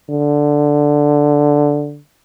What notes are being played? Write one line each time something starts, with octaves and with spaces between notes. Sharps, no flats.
D3